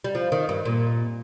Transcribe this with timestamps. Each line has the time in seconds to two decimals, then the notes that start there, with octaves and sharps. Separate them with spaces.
0.04 G3
0.15 F3
0.32 D#3
0.49 G2
0.65 A#2